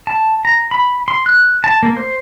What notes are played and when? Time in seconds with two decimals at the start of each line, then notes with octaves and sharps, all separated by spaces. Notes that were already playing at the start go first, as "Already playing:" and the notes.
0.07 A5
0.45 A#5
0.71 B5
1.08 C6
1.26 F#6
1.64 A5
1.83 A#3
1.97 C5